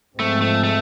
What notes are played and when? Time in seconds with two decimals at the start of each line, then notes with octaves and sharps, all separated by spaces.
0.19 G#2 F3 G#3 A3 C4
0.42 A3
0.64 A3